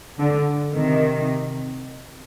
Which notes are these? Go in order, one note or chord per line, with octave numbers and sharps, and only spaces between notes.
D3
C3 D#3